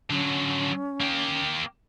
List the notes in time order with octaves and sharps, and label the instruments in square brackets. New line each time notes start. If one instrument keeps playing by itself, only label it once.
[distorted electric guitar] D3 F#3 [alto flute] C#4
[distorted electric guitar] A#3 G4